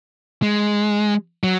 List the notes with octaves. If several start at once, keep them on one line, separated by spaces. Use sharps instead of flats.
G#3
F#3